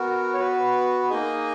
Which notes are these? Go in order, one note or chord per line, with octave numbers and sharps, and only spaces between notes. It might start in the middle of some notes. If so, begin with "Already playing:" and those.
Already playing: B3 F#4 A#4
C#5
B3 F#4 B4
A#3 D#4 G#4 D#5